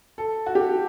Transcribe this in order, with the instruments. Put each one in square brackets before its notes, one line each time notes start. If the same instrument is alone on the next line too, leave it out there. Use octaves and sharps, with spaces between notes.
[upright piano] A4
F#4
G4